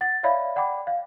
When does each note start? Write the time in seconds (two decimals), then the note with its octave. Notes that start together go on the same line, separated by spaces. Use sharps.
0.01 F#5 A6
0.23 C#5 D5 E5 F5 B5
0.56 D5 F#5 G5 B5 D6
0.87 F5